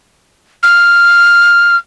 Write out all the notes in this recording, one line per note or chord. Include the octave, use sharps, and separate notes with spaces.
F6